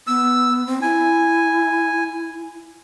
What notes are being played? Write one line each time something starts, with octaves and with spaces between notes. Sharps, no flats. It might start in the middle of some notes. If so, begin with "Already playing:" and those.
B3 E6
C4
E4 G#5